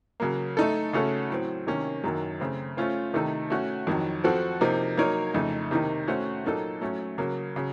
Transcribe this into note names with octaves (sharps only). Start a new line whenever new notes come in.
C#3 F#3 A#3
A3 D#4 A4
C#3 A3 C#4 F#4 A4
A2 F#3 C4
C3 D#3 A#3 C#4
F#2 D#3 F#3 A#3
C#3 A3 C4
A3 C#4 F4 C5
C3 D#3 A3 D#4 A4
A3 C#4 F#4
F2 D#3 F#3
F3 C4 F#4 A4
C3 F3 A#3 D#4
F#3 A#3 D#4 A#4 C#5
F2 C#3 A3 D#4
C3 D#3 A#3 D#4
A3 C#4 F#4 C5
A#2 F#3 A#3 D#4 A4
F#3 A3 C#4
C#3 F#3 A#3
C#3 F#3